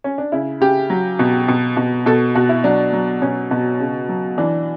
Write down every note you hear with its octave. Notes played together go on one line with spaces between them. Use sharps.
C#4
D4
C#3 E4
C#3 G4
F#3
B2
B2
B2
B2 A4
B2 F#4
E4
F#3 D4
F#3
B2 C#4
B2
C#3
F#3
E3 D4